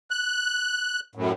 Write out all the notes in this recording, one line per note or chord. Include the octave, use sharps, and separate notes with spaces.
F#6
F#2 A2